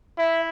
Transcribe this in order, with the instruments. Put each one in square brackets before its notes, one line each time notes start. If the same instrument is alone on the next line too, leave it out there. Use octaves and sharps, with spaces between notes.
[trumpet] E4 [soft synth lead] E5